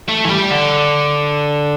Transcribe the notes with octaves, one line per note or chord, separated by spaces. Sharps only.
A3
E3
G3
D3